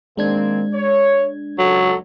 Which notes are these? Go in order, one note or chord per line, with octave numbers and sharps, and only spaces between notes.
D#3 G#3 A#3 C4 D4 G#6
C#5
C#2 F#3 A4